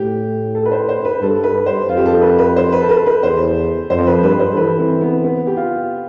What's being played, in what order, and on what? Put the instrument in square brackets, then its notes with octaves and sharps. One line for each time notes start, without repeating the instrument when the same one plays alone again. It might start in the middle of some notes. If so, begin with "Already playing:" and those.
Already playing: [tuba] A2 [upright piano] G4
[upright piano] A4
B4
C5
C5
B4
[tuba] G2 [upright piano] A4
[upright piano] B4
C5
[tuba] F2 [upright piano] F4
[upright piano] G4
A4
B4
B4
C5
B4
A4
B4
B4
[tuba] E2 [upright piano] C5
[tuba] F2 [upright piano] C5
[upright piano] B4
[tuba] G2 [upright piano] B4
[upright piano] C5
A4
[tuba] E3 [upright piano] B4
[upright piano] C4
B3
B3
G4
F4